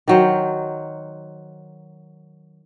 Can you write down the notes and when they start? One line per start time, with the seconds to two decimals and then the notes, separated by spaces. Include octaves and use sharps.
0.08 D#3 F#3 C5